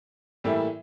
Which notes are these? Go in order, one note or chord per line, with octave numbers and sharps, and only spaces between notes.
A2 E3 G3 A#3 E4